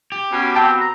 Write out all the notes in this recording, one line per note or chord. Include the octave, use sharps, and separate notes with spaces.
G4
B2 C#4
C4 G5 A5
A#5